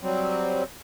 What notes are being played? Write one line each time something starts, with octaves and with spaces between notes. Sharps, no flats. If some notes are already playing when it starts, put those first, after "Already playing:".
F#3 G3 C4